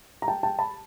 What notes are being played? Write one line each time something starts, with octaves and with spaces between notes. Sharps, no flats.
A#5
G5 A5
G5 A5
A5 B5